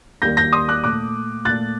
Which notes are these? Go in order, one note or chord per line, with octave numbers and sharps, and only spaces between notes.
D#2 D#3 G3 A#3 G6 A#6
G6 A#6
C6 D#6
D6 F#6
A#2 A3 D6 F#6
A#2 A3 F#6 A6